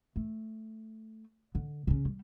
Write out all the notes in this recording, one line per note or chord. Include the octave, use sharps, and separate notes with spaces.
A3
D3
C#3 C#4
G3